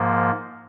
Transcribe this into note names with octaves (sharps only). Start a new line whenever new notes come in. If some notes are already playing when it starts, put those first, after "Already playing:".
Already playing: G#2 F3 A#3